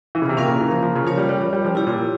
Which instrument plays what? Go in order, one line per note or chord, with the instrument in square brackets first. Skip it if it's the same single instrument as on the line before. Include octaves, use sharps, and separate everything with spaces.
[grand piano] E3
C#3
C3
[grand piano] A#2 [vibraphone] A#3 C#4 F4 A#4 F5
[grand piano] C#3
E3
F3
F3
C#3
[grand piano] F3 [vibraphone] C#4 F4 A#4 C#5
[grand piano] G3
G3
G3
G3
F3
[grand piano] G3 [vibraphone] E4 G4 C#5
[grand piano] A#2